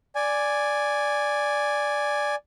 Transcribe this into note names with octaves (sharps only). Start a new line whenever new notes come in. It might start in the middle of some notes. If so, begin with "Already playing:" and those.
D5 G#5